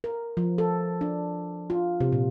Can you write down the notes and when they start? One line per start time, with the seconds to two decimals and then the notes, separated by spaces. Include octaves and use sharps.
0.04 A#4
0.37 F3
0.58 A4
1.01 D4
1.70 F4
2.01 C3
2.13 A#2